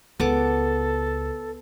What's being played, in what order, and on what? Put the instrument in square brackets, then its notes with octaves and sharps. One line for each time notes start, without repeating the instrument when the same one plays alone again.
[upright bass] C#2 [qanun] B3 A5 D6 [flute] A4